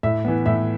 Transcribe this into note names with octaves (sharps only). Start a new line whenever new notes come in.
A2 E5
E3 B3
A2 E5